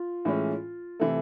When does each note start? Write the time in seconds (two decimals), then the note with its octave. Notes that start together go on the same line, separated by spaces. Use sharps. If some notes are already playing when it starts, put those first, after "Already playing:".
Already playing: F4
0.25 A2 E3 G#3 C#4
1.00 C3 E3 A3